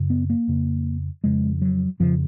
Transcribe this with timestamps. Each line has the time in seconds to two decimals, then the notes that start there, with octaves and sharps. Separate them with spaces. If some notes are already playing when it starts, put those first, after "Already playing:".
Already playing: F#2 C#3
0.10 B3
0.30 A#3
0.48 F2 C#3
1.24 F2 C#3 G#3
1.62 F#3
2.00 F2 C#3 F3